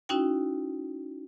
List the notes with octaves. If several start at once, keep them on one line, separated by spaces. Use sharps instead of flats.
C#4 D#4 E4 F#4 G5